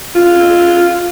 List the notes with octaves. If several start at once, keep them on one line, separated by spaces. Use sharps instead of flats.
F4